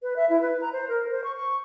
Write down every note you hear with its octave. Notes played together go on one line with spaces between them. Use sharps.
B4
E5
E4
B4
A#5
C5
A#4
C5
C#6
C#6